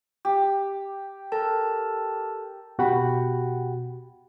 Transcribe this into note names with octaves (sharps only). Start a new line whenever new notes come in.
G4
A4 A#4 A5
B2 F#4 G4 F#5 G5 B5